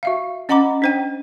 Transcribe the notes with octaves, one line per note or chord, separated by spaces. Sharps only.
F#4 E5 F5
C#4 D#5 F#5 A#5 B5 D6
D4 C5 G5